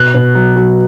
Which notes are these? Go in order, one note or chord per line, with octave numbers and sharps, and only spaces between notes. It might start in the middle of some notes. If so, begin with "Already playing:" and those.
Already playing: B2 F#6
B2
F#3
F#3